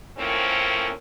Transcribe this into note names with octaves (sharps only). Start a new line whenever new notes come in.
F#2 A2 F3 A#3 C4 C#4